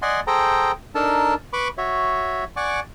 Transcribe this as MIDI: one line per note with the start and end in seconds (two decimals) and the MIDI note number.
0.02 0.20 74
0.02 0.20 75
0.02 0.20 78
0.02 0.20 80
0.02 0.20 84
0.27 0.72 68
0.27 0.72 69
0.27 0.72 72
0.27 0.72 79
0.27 0.72 82
0.95 1.34 62
0.95 1.34 63
0.95 1.34 69
0.95 1.34 70
0.95 1.34 81
1.53 1.68 71
1.53 1.68 83
1.53 1.68 85
1.53 1.68 86
1.78 2.44 66
1.78 2.44 73
1.78 2.44 76
2.57 2.80 74
2.57 2.80 78
2.57 2.80 80
2.57 2.80 85
2.57 2.80 86